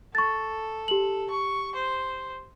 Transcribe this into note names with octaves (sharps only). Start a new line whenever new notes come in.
A4 C#6 A6
G4 F#7
C#6
C5